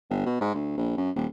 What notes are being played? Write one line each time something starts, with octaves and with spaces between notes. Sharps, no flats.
G1
B2
G#2
D2
A#1
F#2
D#1